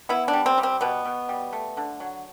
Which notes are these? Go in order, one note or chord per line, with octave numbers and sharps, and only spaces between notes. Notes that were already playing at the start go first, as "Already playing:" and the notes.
B3 E4
D4
G3
C4
G3
C4
B2 B3
B2
G3
A3
D3
F#3